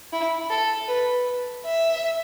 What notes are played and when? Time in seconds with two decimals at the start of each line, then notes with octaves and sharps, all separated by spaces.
0.13 E4
0.50 A4
0.88 B4
1.65 E5